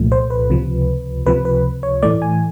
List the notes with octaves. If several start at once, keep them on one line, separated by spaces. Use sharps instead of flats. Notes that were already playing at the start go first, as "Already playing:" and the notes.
Already playing: C2 A#2 F3 A3
C5
B4
C#2 C3 F3
C#2 C3 F3 B4
B4
C#5
A2 E3 A3 D5
G#5